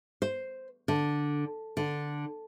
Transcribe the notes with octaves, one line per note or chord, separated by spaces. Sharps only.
C5
D3
D3